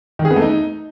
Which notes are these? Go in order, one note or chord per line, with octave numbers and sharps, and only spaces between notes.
D#3
G#4
B3
A3
D#4